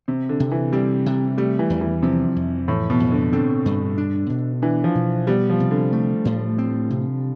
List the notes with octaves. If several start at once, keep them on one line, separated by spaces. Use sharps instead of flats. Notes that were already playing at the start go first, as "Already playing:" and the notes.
C3 C4
D3
C3
E3
G3 C4
C3
G3 A3
E3
E2
E3
C3 F3
F2
A2 E3
B2
F2
D3
D3 C4
G2
D4
B2
E3 D4
F3
B2
G3 B3
F3
C3
D3
A3
A2
C4
C3